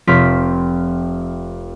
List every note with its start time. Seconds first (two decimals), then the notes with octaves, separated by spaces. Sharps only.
0.07 F1 C4 F4 B6